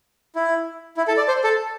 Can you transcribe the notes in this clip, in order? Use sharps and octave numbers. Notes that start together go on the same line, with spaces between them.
E4
E4
A4
D5
C5
A4